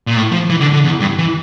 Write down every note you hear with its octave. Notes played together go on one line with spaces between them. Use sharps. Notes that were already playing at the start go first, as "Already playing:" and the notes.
A#2
A2
F3
E3
D3
D3
E2
G2
E3